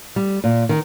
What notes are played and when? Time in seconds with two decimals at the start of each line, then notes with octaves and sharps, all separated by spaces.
0.16 G3
0.44 A#2
0.69 D#3